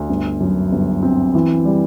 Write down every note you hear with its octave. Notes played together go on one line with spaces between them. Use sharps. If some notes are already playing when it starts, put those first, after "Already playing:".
Already playing: D2
G1
F#2
G1
C4
E3
G3